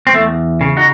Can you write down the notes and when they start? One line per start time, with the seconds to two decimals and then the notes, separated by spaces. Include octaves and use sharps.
0.07 C4
0.13 E2 A3
0.61 C#3
0.77 D#4 F#4